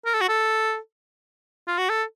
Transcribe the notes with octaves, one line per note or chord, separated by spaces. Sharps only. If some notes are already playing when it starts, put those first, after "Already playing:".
A#4
A4
F#4
A4
F4
F#4
A4